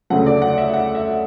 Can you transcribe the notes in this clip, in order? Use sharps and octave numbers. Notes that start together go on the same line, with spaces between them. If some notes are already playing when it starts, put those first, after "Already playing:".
D2 C#3 F#3 A3 F#5
D5
F#5
E5
F#5
E5